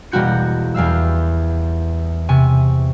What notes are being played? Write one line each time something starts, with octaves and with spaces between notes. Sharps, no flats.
E1 G3 A#3 F#4 G6 C#7
E2 G3 F5 E6
C3 G#5 C#6